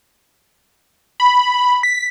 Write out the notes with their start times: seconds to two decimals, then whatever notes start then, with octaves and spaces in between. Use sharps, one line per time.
1.20 B5
1.83 B6